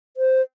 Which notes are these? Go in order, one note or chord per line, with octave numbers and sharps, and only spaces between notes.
C5